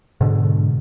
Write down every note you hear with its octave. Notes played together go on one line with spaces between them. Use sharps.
G#2 B2 D3